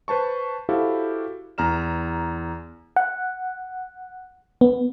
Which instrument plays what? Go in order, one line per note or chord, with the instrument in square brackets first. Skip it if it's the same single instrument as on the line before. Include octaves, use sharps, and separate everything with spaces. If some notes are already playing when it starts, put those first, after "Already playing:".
[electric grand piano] B4 C5 A5 C#6
E4 F#4 G4 A4 C5 F5
E2 A#5 F6 E7
[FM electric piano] F#5
B3